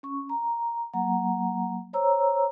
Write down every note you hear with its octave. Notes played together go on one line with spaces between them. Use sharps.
C#4 C#6
A#5
F#3 A#3 F#5 A#5
C5 C#5 A#5 E6